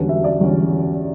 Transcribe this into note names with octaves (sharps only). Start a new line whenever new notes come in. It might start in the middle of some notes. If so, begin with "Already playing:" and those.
Already playing: E1 E2 D3 G3 C#4 B4
E5
D5
E1 E2 D3 G3 C#4